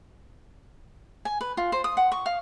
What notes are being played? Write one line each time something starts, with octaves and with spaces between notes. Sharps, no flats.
G#5
B4
F4
C5
D#6
F#5
C#6
F5